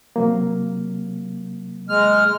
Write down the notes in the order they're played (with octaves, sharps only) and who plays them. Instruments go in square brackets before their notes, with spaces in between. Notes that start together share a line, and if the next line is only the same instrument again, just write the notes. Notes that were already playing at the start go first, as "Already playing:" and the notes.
[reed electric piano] C3 F#3 A#3
[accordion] G#3 F6